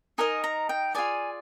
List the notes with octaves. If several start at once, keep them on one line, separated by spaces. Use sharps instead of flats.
D#4 A#4 D#5 G#5
A#5
G5
F4 G#4 D5 G#5